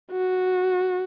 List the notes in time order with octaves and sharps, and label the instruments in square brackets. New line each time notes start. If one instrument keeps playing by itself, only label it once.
[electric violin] F#4